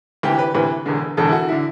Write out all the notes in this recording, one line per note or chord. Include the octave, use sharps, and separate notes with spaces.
D2 C3 E3 G4
B4
D2 C3 E3 B4
E1 E2 D3
E1 E2 D3 A4
E4
F#4
D3 E4